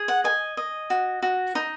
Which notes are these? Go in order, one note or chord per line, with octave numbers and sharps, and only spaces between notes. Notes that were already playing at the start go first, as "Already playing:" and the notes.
Already playing: G#4
F#5
D#5 G#5
D#5
F#4
F#4
D#4